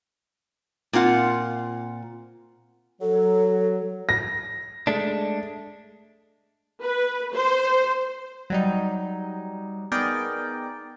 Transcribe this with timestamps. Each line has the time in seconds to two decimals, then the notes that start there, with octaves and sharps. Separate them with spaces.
0.93 A#2 C4 F4 F#5
3.01 F#3 A4
4.09 A#6
4.87 G#3 A3 D4
6.81 B4
7.34 C5
8.50 F#3 G3 D#4
9.92 B3 D#4 G#4 A#4 D5 G5